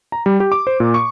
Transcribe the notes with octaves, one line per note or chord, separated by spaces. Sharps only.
A#5
G3
G4
D6
C5
A#2
C#6